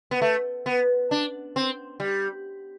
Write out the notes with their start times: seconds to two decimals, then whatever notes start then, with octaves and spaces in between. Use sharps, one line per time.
0.11 B3
0.22 A3
0.66 B3
1.11 D4
1.56 C4
2.00 G3